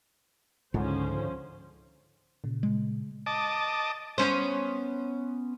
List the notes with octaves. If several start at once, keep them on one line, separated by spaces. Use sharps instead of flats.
C#2 G#2 D3 F3 C#4 C5
A#2 C#3
G#3
D#5 A5 D6
B3 C#4 C5